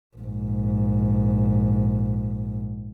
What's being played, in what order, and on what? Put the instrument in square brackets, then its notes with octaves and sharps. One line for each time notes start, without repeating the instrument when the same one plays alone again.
[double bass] A#1 G#2